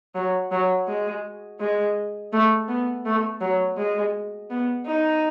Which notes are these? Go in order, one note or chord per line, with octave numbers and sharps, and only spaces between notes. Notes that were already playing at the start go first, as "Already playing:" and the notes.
F#3
F#3
G#3
G#3
A3
B3
A3
F#3
G#3
B3
D#4